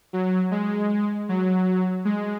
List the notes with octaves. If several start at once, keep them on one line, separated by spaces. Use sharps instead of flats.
F#3
G#3
F#3
G#3